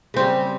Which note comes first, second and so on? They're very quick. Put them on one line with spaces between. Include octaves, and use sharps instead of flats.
C#3 C4 G3